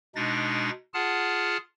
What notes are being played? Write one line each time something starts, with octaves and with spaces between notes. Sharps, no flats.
B2 G#3 D4 D#4 A6 A#6
F4 G#4 F#5 A5 F6